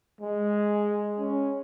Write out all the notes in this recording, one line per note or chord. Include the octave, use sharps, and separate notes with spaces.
G#3
C#4